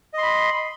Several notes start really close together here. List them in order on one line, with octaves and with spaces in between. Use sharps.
D#5 C6 B5